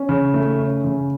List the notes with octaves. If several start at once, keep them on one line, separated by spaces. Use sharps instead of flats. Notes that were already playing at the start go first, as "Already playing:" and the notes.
Already playing: C#4
C#3
A3
C#4
C#3